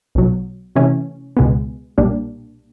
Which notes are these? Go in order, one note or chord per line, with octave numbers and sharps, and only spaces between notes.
B1 B2 F#3
C3 E3 A3 C#4
C#2 B2 G#3 B3
B1 A#2 G3 A#3 D4